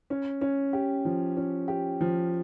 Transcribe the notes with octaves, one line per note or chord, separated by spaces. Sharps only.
C#4
C#4
G4
F3
C#4
G4
F3